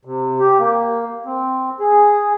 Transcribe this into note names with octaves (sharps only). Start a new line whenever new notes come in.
C3
G4
A#3
C4
G#4